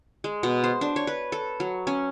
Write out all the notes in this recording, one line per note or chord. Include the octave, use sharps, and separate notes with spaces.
G#3
B2
C5
D4
C#5
B4
A4
F#3
C#4